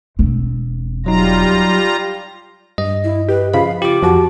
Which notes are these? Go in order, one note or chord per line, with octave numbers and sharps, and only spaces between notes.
E1 C4
F#3 G3 D#4 F4 A#5
G2 D#5
E4
G4 B4
C#3 F3 F5 B5
F4 G4 D6
F2 F3 F#4 A5